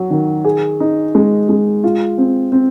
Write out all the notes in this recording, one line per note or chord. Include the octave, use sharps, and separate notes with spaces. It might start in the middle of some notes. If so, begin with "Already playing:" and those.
Already playing: F#3
D#3
G#4
D#4
G#3
G#3
F4
C4
C4